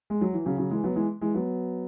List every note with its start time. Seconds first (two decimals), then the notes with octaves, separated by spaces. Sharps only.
0.10 G#3
0.21 F#3
0.33 E3
0.46 C#3 F#3
0.58 C#3 F#3
0.71 E3 G#3
0.84 F#3 B3
0.96 E3 G#3
1.21 E3 G#3
1.34 F#3 B3